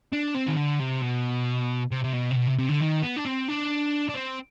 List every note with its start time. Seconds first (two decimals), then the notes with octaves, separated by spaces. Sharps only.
0.13 D4
0.35 C4
0.48 D#3
0.57 D3
0.80 C3
1.02 B2
1.92 C3
2.04 C3
2.13 B2
2.31 C3
2.36 B2
2.47 C3
2.58 C3
2.69 D3
2.81 D#3
3.02 B3
3.16 D4
3.25 C4
3.48 D4
4.09 D4
4.15 C4